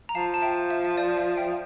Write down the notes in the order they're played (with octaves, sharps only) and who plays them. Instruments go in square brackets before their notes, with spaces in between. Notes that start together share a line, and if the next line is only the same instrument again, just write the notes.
[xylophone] A#5
[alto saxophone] F3 [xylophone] F5 A5
[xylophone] A5
E5 G5
E5
E5
D5
E5
E5 G5